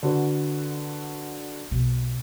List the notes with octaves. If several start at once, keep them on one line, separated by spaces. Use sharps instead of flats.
D3 F#4 B4
B1 B2